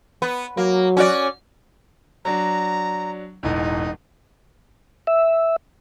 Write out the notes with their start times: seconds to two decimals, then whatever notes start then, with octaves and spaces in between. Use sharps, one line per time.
0.22 B3
0.57 F#3 A#3
0.97 C#4 F#4 D5
2.25 F#3 D4 A#5
3.43 E1 A1 E2 D#4
5.07 E5